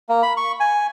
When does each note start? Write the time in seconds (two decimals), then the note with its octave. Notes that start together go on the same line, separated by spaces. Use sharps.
0.09 A#3
0.23 B5
0.37 C#6
0.60 G#5